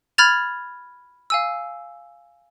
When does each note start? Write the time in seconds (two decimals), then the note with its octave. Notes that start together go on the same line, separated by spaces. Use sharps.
0.18 B5 F6 G#6 A6 F7
1.30 F5 G#5 E6